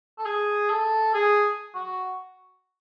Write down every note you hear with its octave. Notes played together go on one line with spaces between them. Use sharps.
A4
G#4
A4
G#4
F#4